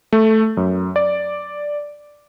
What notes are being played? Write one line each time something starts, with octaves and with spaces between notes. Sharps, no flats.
A3
F#2
D5